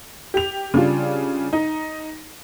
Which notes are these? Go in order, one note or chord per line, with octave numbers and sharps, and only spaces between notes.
G4 F7
C#3 G3 D4 F4
D#4